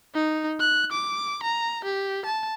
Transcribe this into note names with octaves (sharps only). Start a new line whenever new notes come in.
D#4
F#6
D6
A#5
G4
A5